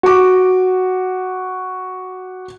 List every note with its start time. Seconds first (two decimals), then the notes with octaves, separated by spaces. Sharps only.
0.03 F#4 D6